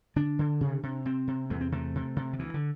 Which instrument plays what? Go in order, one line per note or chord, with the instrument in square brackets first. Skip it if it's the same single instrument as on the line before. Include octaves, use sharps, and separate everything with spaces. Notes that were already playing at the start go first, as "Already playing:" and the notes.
[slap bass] D3 D4
D3
C3
C3
C3 C4
C3
E2 A3
C4
C3 A3
C3
C3
D3
D2 E3
D3